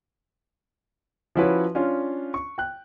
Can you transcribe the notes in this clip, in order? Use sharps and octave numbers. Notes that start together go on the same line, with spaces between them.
F3 C#4 E4 F#4 B4 C#5
C#4 D4 F4
C#6
G5 F#6